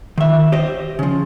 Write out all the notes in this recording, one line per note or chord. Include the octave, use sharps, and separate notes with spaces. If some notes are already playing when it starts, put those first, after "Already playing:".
D#3 E5
G4 C5 D#5
C#3 F3